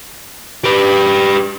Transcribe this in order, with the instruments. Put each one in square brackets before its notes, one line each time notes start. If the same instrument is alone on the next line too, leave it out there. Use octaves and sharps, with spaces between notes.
[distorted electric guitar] G4 B4